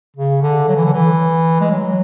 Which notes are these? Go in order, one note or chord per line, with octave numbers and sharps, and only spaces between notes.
C#3
D3
F#3
E3
D3
E3
G#3
F#3